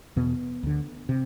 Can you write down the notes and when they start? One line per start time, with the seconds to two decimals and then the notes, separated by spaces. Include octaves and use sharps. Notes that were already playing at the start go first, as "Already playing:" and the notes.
0.16 E2 B2 B3
0.63 D2 D3
1.09 C3